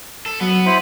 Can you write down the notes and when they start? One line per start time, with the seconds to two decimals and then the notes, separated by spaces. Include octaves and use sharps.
0.26 A4
0.40 F#3 B3
0.66 E4 C5 B5